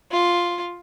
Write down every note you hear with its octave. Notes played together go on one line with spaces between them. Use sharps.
F4